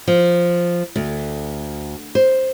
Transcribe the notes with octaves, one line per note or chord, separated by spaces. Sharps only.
F3
D2
C5